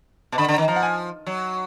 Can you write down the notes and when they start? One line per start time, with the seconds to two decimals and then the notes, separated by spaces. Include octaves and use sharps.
0.32 B2
0.38 D3 B5
0.48 D3
0.54 D#3 A#5
0.68 F3 A#5
0.76 F#5
0.83 G#5
1.27 F#3